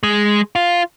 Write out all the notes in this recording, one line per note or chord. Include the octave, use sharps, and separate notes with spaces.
G#3
F4